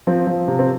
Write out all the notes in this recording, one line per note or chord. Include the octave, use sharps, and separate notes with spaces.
F3 C4
F3
C3
C4